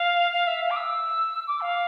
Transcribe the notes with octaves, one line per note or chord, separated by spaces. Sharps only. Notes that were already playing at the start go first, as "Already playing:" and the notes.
Already playing: F5
F5
E5
F5
D6
E6
D6
F5